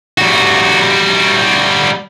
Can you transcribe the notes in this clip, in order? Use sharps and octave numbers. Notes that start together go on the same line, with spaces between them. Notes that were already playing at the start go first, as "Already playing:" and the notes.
G3 F#4